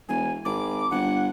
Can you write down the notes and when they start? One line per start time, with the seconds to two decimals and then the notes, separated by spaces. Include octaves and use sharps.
0.09 E1 G#5
0.45 G#1 D6
0.91 G1 F#5